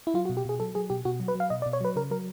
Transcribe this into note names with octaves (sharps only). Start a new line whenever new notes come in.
E4
F#3 F4
F#4
B2
G4
B2 G#4
F#3 A4
F#3 G#4
B2 G4
B2 F#4
F#3
B4
F#3 F5
B2 D#5
D5
B2
C#5
F#3 B4
C#3 A#4
F#3 A#4